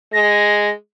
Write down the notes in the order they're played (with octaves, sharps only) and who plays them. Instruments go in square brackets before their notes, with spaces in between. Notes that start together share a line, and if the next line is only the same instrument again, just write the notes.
[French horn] G#3 [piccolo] A#6